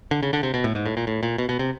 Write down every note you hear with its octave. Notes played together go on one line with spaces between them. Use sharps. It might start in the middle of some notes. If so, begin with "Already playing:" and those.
D3
C#3
D3
C3
B2
A2
G#2
A2
A#2
A2
A#2
B2
B2
C3